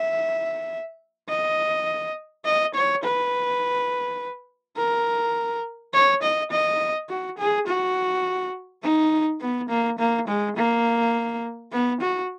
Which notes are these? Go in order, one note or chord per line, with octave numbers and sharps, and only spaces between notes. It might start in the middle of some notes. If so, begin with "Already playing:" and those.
Already playing: E5
D#5
D#5
C#5
B4
A#4
C#5
D#5
D#5
F#4
G#4
F#4
D#4
B3
A#3
A#3
G#3
A#3
B3
F#4